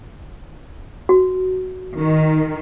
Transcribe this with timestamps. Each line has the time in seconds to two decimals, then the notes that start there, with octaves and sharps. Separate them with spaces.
1.09 F#4
1.97 D#3